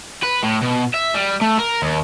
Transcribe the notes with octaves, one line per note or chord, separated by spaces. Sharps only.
B4
A2
B2
E5
G3
A3
A#4
D#2